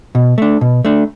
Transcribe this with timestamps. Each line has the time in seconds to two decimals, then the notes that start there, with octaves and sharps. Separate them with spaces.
0.15 B2
0.38 A3 D4
0.61 B2
0.85 A3 D4